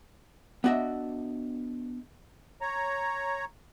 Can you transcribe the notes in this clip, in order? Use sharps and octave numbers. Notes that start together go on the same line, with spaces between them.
B3 D4 F#4 D#5 E5
C#5 A#5